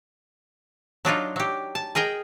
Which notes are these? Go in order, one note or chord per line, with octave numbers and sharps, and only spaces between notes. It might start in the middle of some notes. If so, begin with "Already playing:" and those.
F#3 D4 D#4 F4
F#3 G4
A5
G#4 A#4 D#5 G5